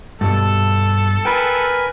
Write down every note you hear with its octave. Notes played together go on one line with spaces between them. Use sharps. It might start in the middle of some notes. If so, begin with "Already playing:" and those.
G2 B2 A4
A#4 B4 G5 G#5 B5